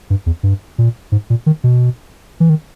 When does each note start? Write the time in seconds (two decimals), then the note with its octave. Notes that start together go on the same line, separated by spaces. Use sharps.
0.10 G2
0.26 E2
0.43 G2
0.78 A#2
1.12 G#2
1.30 A#2
1.46 D#3
1.64 B2
2.40 E3
2.50 D#3